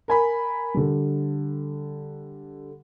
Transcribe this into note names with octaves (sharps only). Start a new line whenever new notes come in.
A#4 G#5 B5
D3 G3